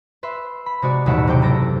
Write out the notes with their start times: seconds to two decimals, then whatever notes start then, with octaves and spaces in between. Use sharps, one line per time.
0.23 B4 E5 C6
0.66 B5
0.82 C3 G#3 F#4 D5
1.06 A1 D#2 B2 G3 E5 F#5
1.27 C3 F#3 B3 G5 D6
1.42 F#1 A4 D6 A#6